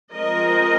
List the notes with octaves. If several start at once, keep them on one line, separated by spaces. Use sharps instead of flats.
F3 G#3 C4 A#4 D#5